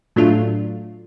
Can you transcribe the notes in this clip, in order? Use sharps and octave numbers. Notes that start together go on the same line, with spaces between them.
A2 F#3 A3 D4 F4